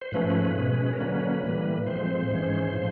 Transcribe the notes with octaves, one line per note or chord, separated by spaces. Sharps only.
C5
G#2 F3 A3 C#4 B4
B2 G#3 C#4
A#4
D3 F#3 A#3 C#4 B4
A2 E3 G3 A#3
A2 F3 G#3 C4 C5
G#2 E3 G#3 C#4
A2 F3